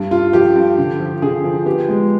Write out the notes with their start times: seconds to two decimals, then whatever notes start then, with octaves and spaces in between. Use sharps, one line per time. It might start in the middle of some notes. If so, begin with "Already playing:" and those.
Already playing: G2
0.11 G2 F4
0.33 F3 G4
0.56 G2
0.78 D3
1.00 F3
1.22 D3 G#4
1.44 F3
1.66 B3 G4
1.88 G#3